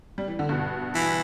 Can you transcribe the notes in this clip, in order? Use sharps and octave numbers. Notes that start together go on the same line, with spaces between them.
G3
E3
D3
G2 B2
E3